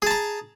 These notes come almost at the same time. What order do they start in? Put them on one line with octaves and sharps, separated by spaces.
G#4 A5 A#5